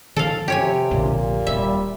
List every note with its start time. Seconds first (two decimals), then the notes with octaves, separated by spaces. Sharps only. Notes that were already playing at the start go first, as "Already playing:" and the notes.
0.16 D#3 F3 A4 F5
0.48 C3 G4 C#5 G#5
0.91 A#1 F2 A#2 D3
1.47 D#1 G3 E5